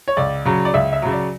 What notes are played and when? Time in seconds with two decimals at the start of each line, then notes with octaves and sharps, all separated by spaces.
0.08 C#5
0.17 C#2 D5
0.45 C#3 F#3
0.65 D5
0.74 C#2 E5
0.93 E5
1.02 C#3 F#3
1.12 D5